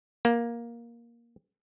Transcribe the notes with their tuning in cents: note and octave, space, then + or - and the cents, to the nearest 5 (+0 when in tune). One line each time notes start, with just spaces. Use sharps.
A#3 +10